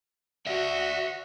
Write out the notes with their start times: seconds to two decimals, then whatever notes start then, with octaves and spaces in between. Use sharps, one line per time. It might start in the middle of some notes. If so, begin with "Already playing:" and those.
0.47 F#4 D5 E5